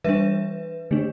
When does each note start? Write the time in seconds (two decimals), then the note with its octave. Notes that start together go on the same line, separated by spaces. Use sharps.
0.04 E3 G3 D4 B4 E5
0.91 D3 A3 D4